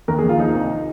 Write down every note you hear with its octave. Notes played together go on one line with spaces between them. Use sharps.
D#2 A#4
G#4
D#2
F4
F3 D#4
C2